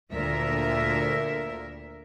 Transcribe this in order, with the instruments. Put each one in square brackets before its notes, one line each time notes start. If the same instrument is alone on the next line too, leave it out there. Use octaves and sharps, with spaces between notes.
[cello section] D2 A#2 A#4 E5